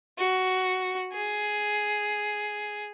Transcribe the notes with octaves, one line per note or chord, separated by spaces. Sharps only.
F#4
G#4